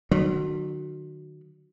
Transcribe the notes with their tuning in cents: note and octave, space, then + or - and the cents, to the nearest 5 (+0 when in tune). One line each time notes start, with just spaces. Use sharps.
D#3 -45 F#3 -5